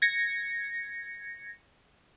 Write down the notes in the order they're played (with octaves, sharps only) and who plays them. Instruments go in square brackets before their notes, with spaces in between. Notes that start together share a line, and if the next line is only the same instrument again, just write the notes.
[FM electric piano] G#6 A#6 C#7